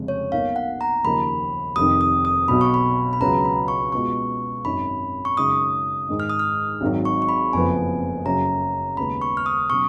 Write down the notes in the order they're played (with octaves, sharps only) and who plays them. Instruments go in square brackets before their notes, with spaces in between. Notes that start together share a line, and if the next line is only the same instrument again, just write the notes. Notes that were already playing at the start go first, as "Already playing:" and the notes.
Already playing: [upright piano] F1 F2 C#3 G#3 C#4
[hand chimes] C#5
[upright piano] B1 B2 A#3 D#4 [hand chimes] F5
[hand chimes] F#5
A#5
[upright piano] D#2 C#3 F3 A#3 D#4 [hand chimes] B5
[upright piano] F1 F2 D#3 [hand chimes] D#6
[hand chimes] D#6
D#6
[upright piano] B1 B2 F#3 [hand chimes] B5
[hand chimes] C#6
B5
B5
[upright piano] C#2 C#3 F#3 B3 [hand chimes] A#5
[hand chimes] B5
C#6
[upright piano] B2 G#3 B3 F4 [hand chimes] C#6
[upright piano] G#1 F#2 D#3 G#3 D#4 [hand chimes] B5
[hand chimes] C#6
[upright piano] F#2 C#3 G#3 D#4 [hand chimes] D#6
[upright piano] G#2 D#3 G#3
[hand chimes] F6
D#6
F6
[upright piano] G#1 G#2 D#3 F#3
[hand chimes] C#6
C#6
B5
[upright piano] F#1 F2 F3 B3 [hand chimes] G#5
[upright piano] F#2 C#3 F#3 [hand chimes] A#5
[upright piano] D#2 C#3 G#3 B3 [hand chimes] B5
[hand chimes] C#6
F6
D#6
[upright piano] B2 F#3 C#4 [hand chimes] C#6